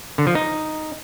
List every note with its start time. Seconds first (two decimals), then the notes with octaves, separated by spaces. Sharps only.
0.18 D3
0.27 F3
0.35 D#4